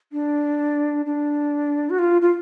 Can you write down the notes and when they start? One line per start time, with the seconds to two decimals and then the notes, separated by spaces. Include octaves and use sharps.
0.12 D4
1.06 D4
1.90 F#4
1.99 F4
2.22 F4